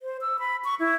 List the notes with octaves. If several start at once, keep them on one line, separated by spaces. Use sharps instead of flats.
C5
E6
B5
C#6
E4